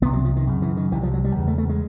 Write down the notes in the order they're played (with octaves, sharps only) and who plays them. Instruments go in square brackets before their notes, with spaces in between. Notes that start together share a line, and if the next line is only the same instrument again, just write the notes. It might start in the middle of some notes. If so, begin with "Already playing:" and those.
[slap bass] C2 C3 B3
F#3
F3
D#3
F#2 C#3
E3
D#3
C2 E3
C3
F3
F#3
G3
E2 C#3
A3
A3
G#3